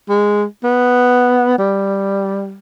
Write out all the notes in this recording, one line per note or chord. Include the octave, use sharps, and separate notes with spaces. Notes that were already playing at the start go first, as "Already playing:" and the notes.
G#3
B3
G3